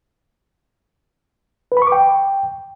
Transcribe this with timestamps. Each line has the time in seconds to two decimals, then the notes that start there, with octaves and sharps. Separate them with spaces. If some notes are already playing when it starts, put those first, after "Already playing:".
1.72 B4
1.77 B5
1.82 C#6
1.87 D6
1.92 G5